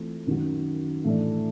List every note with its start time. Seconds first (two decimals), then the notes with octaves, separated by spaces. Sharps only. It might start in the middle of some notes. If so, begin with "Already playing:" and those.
Already playing: E3 A3 C4 F4
0.26 F#2 D#3 F#3
1.04 A2 E3 A3 D4